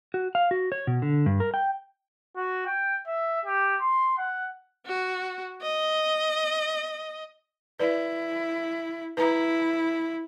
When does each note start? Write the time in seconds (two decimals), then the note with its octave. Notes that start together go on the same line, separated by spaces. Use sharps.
0.14 F#4
0.35 F5
0.51 F#4
0.72 C#5
0.87 B2
1.02 D3
1.26 G2
1.40 A#4
1.54 G5
2.37 F#4
2.66 G5
3.08 E5
3.45 G4
3.81 C6
4.18 F#5
4.86 F#4
5.62 D#5
7.79 E4 B4 D5
9.17 E4 B4 A#5